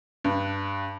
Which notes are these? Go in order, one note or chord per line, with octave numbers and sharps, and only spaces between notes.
G2